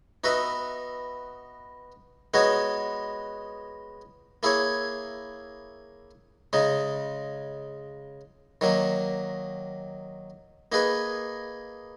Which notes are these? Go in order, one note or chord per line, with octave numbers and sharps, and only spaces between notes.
B3 D#4 F#4 B4 E5
G#3 B3 D#4 F#4 C#5
A#3 E4 G#4 C#5
C#3 G#3 D#4
D#3 F#3 A#3
A#3 D#4 G#4 B4